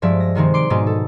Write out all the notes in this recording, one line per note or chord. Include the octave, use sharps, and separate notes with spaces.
G2 F3 G#3 D5 E5
A#6
C3 D#3 G#3 C4
C6 D6 D7
G#2 B2 G#3 D#4
A4